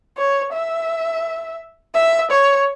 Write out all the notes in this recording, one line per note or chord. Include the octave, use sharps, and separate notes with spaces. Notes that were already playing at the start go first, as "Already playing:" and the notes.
C#5
E5
E5
C#5